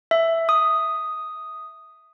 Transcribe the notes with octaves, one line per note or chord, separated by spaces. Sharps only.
E5
D#6